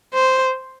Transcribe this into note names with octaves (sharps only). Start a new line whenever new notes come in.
C5